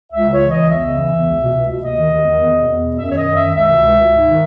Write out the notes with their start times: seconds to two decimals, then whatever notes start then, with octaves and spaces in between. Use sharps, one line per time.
0.12 C#2 E5
0.26 C#3 C#5
0.41 E3
0.50 C#2 D#5
0.68 E2 E5
0.83 C#3
0.97 E3
1.12 E2
1.26 C#2
1.40 B2
1.55 C#2
1.68 B2
1.83 D#2 D#5
1.98 D#3
2.12 D#2
2.25 D#3
2.39 E2
2.55 B2
2.68 E2
2.83 B2
2.97 F#2 E5
3.10 D#3 C#5
3.16 D#5
3.25 F#2
3.35 D#3 E5
3.54 C#2 E5
3.68 B2
3.82 C#2
3.97 B2
4.12 G#2
4.26 D#3